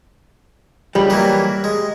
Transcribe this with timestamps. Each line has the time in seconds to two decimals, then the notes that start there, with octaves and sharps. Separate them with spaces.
0.95 C#2 G3
1.10 E3 F#3 A#3
1.64 G#3